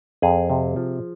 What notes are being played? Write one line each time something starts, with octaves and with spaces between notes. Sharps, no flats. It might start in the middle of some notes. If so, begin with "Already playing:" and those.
F2 G#4
C3
F3